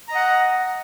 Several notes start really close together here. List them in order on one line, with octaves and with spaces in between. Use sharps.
A#5 D#5 F#5